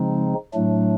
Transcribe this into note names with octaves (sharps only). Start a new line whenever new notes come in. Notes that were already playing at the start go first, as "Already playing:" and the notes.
Already playing: C#3 F3 G#3 C4 D#4
A2 F#3 A3 D4